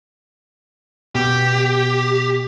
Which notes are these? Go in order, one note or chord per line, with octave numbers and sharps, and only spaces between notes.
B2 G4